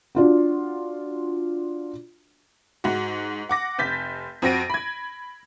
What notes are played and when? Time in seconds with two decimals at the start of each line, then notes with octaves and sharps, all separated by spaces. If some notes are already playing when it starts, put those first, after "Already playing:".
0.15 D4 F4 F#4
2.84 G#2 F#4
3.49 F#5 D6 A#6
3.78 F1 G6 A6 B6
4.42 F2 C4 F#4 A#6 D7 D#7
4.70 B5 G#6